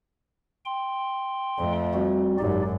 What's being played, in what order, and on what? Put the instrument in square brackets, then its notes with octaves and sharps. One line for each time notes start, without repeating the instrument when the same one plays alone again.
[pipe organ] G5 C6
[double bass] F2 A3
[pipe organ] G3 C4 F#4
[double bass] G#1 F#2 [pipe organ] D#4 G4 D5